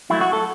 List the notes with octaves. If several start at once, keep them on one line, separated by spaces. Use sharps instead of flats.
F#3 A3 E4
F#4
A4